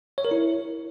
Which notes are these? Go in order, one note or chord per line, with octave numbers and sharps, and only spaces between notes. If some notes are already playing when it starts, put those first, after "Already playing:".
C#5
A#4
E4